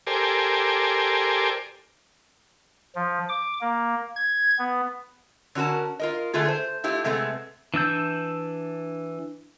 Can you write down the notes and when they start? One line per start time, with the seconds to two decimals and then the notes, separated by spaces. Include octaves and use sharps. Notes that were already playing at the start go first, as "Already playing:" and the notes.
0.07 G4 A4 A#4 C5 D5 G#5
2.95 F3
3.29 D6
3.61 A#3
4.16 G#6
4.59 B3
5.55 D3 C#4 F#4 A#4 A5
5.99 F4 A#4 D#5
6.33 D3 A3 D4 F4 G#4
6.48 C5
6.84 A3 E4 F4 G4
7.04 C3 G#3 A3 B3 C4
7.74 E3 D4 E6 G6